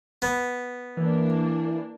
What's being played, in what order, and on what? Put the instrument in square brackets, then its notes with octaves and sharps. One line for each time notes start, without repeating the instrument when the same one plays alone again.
[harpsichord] B3
[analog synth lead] E3 [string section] A#3 D4